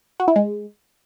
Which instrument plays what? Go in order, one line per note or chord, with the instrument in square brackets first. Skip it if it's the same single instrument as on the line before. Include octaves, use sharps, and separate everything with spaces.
[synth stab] F#4
E4
G#3